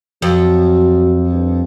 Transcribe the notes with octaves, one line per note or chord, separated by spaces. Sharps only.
F2 F#3
G2